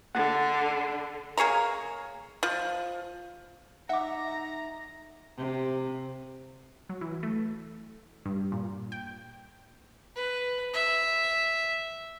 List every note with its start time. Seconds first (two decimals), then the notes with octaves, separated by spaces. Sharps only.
0.15 D3 F#5
1.38 A#3 G#4 C#5 A#5
2.43 F3
3.89 D#4 E5 F#5 A#5 D6
5.37 C3
6.89 F#3
7.01 E3
7.23 A3
8.25 G2
8.52 A#2
8.92 G5
10.15 B4
10.73 E5